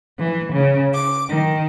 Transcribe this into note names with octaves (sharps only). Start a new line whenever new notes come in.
E3
C#3
D6
D#3